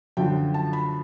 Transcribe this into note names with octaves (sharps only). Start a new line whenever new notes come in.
F#2 D3 F3 G5
A5
B5